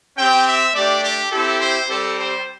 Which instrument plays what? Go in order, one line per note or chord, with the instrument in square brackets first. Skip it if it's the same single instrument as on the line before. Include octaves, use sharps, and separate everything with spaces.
[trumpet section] C4 G4 G5
E5
A3 D4 G4 D5
G4
C4 E4 G4 A4
C5
G3 C4 G4 A4
C5